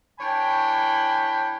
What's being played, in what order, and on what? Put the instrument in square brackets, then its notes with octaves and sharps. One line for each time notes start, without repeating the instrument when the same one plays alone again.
[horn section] E3 D4 C#5 G5 B5